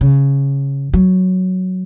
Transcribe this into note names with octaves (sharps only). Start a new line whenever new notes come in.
C#3
F#3